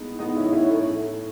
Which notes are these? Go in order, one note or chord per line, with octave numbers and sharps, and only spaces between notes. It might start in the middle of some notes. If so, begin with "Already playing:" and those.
Already playing: A2 G#3 B3 D#4
A2 B3 D#4
C#4 E4
A2
C#4 E4
A2 A3 C#4
A2